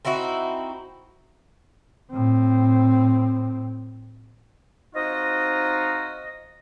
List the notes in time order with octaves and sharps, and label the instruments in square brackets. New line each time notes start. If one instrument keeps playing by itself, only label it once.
[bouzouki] C4 D#4 E4 F#4
[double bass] A2 C4
[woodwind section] C4 D#4 F4 F#4 D#5